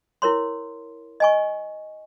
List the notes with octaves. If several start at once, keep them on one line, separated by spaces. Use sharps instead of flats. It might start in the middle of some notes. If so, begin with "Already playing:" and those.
E4 A#4 C#5 C6
D#5 G#5 C#6